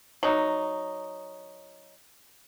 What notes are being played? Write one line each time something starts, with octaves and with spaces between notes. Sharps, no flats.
F#3 D#4